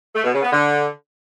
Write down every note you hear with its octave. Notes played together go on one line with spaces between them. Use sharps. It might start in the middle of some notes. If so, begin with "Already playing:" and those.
A3
B2
C#3
B3
D3